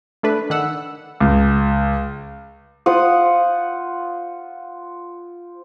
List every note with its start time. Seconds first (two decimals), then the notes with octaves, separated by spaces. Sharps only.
0.23 A3 D4 A4 B4
0.50 D#3 D4 F#5 E6
1.20 C#2
2.86 F4 C5 F#5 D#6